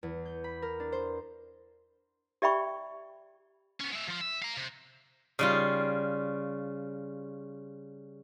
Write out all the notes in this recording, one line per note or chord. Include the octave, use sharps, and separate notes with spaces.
E2
G6
B5
A#4
D4
C5
G4 D5 E5 G5 B5 C#6
B3 C#4
G#3 E5
F3 F4
E5
F5 A#5
C3
C#3 G3 F4